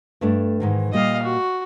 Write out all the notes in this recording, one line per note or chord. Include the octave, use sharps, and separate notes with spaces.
G2 A3 D4
G#2 D#3 E3
A#2 G3 A#3 D#5 F5
F#4